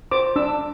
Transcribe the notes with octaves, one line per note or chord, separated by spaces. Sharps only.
C5 D6
D4 E6